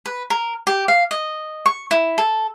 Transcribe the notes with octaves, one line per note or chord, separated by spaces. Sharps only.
B4
A#4
G4
F5
D#5
C#6
E4
A4